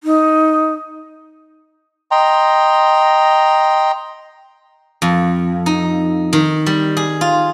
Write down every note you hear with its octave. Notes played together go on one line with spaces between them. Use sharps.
D#4
D#5 G5 A#5 C6
F2
D#4
D#3
G3
G#4
F4